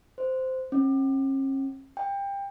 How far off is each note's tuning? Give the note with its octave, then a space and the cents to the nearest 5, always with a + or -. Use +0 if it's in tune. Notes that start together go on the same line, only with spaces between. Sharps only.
C5 -10
C#4 -45
G5 +25